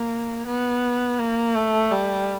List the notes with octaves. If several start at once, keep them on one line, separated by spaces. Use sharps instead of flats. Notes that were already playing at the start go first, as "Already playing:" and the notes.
Already playing: A#3
B3
A#3
A3
G3